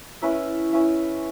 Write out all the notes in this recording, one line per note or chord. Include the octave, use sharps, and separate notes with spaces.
C#4 E4 B4 E5
C#4 E4 B4 E5